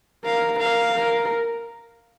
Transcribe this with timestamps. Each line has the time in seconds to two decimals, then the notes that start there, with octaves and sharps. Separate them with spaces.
0.25 A#4 F5
0.59 A#4 F5
0.93 A#4